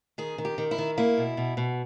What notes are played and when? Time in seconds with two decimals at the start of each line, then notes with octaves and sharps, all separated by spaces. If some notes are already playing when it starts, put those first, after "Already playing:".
0.18 D#3 G#4
0.38 D#3
0.45 G4
0.58 D#3
0.71 E4
0.78 D#3
0.98 A#3 E4
1.18 B2
1.37 B2
1.57 B2